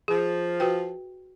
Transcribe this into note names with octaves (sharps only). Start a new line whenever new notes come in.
F3 G#4
F#4 B4 G5